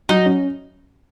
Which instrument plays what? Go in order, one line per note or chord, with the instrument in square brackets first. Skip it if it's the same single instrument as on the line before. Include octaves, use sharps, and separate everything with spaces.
[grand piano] F#3 [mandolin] D#4
[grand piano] C#4